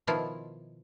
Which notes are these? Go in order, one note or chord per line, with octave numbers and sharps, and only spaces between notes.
B2 D#3 F3 E4 F4